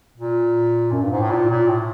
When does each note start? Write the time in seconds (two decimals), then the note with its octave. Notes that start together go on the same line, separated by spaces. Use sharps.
0.18 A#2
0.92 F#2
1.02 G2
1.11 G#2
1.21 A2
1.30 A#2
1.50 A#2
1.68 A2